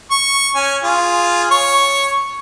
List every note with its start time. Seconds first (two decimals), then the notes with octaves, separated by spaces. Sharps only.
0.11 C#6
0.55 C#4 G#5
0.83 F4 G#4
1.51 C#5 C#6